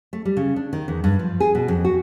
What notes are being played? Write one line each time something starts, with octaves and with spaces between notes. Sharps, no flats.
A3
G3
C#3
D4
D#3
E2
G2
F3
G#4
B2
F2
F#4